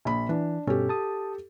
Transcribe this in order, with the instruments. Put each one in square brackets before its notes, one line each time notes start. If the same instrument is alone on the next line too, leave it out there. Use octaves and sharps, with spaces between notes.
[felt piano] A#1 B5
[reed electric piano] E3 [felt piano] D4
[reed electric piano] G2 B2 C#4 [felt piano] G4 A4
[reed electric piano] A5 D#6